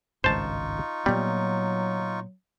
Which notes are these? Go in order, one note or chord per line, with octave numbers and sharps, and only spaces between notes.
G#1 C#2 G2 D#4 F4 C5 A5 C#6
A#2 F#3 G3 B3